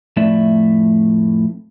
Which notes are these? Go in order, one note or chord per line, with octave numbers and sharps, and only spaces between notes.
F2 A2 A3 D5 E5